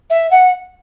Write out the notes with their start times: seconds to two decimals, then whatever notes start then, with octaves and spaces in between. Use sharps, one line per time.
0.10 E5
0.31 F#5